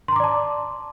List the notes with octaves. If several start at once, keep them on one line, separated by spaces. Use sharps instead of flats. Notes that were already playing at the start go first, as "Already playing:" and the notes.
D5 A5 A#5 C6 D6